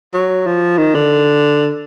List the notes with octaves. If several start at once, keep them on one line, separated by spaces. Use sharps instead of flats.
F#3
F3
D#3
D3